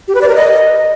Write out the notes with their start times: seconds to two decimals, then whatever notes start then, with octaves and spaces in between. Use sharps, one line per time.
0.08 G4
0.15 B4
0.21 D5
0.28 A#4
0.35 D#5